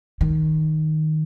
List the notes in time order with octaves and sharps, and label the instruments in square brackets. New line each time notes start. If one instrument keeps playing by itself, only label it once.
[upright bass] D#3